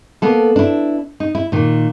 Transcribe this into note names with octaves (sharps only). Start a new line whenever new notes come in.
A#3 B3 A4
D4 E4
D#4
E4
A#2 D#3